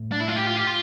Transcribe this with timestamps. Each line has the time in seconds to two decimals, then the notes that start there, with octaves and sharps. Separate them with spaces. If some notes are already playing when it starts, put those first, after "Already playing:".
Already playing: A2
0.12 D4
0.20 E4
0.28 F4
0.36 G4
0.46 F4
0.56 G4
0.67 F4